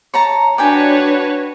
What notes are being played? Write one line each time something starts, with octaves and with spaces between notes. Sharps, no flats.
C#5 A5 A#5
D4 F#4 B4 C#5 D5 G5 G#5